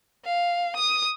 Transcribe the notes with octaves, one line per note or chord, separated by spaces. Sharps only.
F5
D#6